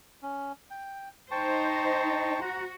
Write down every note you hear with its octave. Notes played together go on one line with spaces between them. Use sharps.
C#4
G5
D#4 C5 G5 A5 C#6
F#4 F#5 A#5